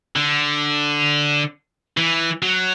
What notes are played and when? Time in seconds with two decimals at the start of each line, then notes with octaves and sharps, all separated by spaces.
0.16 D3
1.97 E3
2.42 F#3